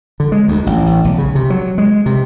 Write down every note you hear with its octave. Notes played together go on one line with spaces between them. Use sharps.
D3
G#3
D2
A1
A1
B1
C#3
C3
F#3
G#3
C3